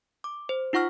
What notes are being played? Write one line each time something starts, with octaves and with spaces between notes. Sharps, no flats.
D6
C5
D#4 F4 F#5 C#6 F6